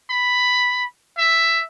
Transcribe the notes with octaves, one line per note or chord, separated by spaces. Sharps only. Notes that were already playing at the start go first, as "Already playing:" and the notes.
B5
E5